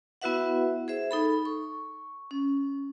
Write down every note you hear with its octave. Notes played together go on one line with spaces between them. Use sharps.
B3 E4 F#4 B4 E5 F#5
G#4 C5 E5
D#4 A4 B5
C#6
C#4